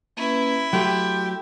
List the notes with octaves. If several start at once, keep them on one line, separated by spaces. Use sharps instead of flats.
A#3 C#4 E4 B4
F#3 A3 G4 C6